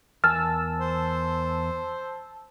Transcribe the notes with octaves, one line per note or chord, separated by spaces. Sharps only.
E2 A#4 G#5 A5 E6 F6
C5